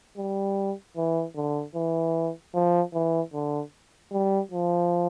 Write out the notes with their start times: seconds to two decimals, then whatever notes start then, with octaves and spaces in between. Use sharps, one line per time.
0.17 G3
0.97 E3
1.36 D3
1.75 E3
2.54 F3
2.93 E3
3.34 D3
4.12 G3
4.51 F3